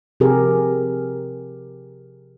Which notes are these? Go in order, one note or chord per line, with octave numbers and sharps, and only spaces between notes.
C3 F3 G4 G#4 A#4